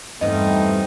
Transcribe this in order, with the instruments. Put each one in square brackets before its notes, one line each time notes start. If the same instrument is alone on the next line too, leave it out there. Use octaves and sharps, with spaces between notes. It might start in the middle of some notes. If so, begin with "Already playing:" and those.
[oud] E2 G2 [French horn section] A3 B3 C4 [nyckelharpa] D#4 [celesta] D#5